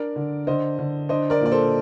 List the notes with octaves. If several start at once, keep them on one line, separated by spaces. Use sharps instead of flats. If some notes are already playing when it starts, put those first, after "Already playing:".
Already playing: D4 A#4 D5
D3
D3 C5 D#5
D3
D4 C5 D#5
A#4 D5
A#2 D5
A4 C5